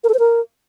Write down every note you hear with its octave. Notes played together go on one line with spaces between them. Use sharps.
A#4
A4
C5
A#4